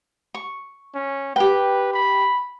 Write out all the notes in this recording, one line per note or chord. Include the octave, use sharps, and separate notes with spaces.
C#6
C#4
G4 B4 G5
B5